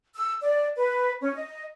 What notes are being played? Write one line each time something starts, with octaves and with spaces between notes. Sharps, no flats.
E6
D5
B4
C#4
D#5